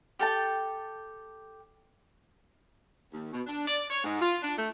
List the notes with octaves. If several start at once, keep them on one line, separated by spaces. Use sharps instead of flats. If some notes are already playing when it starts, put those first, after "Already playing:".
G4 A4 G5 A5
D#2
B2
D4
D5
C#5
G#2
F4
D4
A3